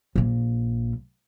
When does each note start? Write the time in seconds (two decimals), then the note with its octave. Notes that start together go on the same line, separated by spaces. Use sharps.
0.16 A#1 A#3